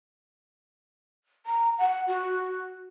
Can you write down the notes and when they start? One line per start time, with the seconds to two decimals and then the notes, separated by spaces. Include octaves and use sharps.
1.46 A#5
1.79 F#5
2.07 F#4